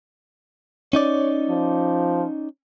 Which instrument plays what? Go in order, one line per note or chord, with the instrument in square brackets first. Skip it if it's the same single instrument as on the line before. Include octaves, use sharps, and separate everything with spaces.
[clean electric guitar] C#4 D#4 D5 [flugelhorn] C#5
[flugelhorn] F3